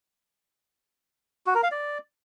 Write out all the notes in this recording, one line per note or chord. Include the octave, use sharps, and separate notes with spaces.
F#4
A#4
F5
D5